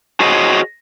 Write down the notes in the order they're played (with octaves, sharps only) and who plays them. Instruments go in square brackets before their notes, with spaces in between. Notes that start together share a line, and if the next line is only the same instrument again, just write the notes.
[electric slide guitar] F#4 G#4 C5 C#5 D#5